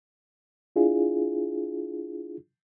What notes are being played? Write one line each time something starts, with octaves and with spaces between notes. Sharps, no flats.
D4 E4 F4 G#4